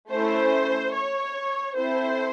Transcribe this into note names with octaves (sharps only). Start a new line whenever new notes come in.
A3 C#4 E4 C5
C#5
C4 E4 A4 C5